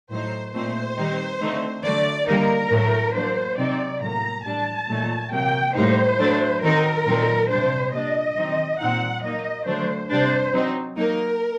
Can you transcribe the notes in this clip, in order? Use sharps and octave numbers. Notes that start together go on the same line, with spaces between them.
A2 F#3 A3 D#4 C5
A#2 A3 C4 D#4 C5
D#3 G3 C4 D#4
D3 A3 C4 D#4
D3 F#3 A3 D5
D3 G3 A#3 D#4 A#4
A2 F#3 A3
F#3 A#3 D4 C5
C3 F#3 C4 D#4 D5
A2 F#3 A#3 A#5
A2 G3 D4 A5
A#2 F#3 A3 D#4
C3 F#3 A#3 G5
A2 G3 A#3 D#4 C5
F#3 A3 D4
D#3 F#3 C4 D#4 A#4
A#2 F#3 C4 D#4
C3 G3 D4 C5
A#2 G3 D4 D#5
D#3 F#3 C4 D#4
A#2 G3 C4 D#4 F#5
F#3 A#3 D#4 D#5
D3 F#3 A3 D4 C5
C3 G3 D4 C5
F#3 C4 D#4
F#3 A#3 D#4 A#4